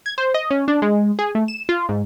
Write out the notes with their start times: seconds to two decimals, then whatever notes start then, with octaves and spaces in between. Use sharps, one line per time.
0.06 G#6
0.18 C5
0.34 D#5
0.51 C#4
0.68 D4
0.82 G#3
1.19 G#4
1.35 A3
1.48 E7
1.69 F4
1.89 G#2